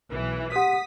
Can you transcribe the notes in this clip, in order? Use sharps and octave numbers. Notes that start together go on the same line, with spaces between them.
B1 E3
G4 F#5 D#6 B6